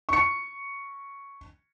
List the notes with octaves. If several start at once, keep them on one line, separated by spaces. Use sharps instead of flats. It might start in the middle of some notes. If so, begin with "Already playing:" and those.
C#6 C#7